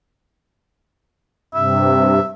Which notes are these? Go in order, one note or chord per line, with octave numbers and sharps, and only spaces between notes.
G2 C3 E5